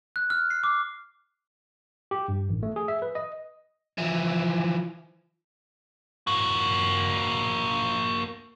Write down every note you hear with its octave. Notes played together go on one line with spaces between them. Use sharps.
F#6
F6
C7
D6
G4
G2
A1
A3
G#4
E5
B4
D#5
E3 F3
A#3 F#4